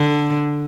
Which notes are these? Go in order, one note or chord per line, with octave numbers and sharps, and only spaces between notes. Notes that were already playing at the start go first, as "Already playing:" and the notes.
Already playing: D3